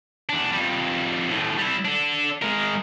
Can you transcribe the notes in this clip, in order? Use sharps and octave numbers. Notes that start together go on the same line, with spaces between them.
E2 D4
F2 G3
D#2 A2
G3 E4
D4 A4
G#3 A#4